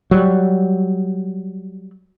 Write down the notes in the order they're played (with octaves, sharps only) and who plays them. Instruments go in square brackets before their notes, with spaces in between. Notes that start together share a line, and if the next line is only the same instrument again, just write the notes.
[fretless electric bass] F#3 G3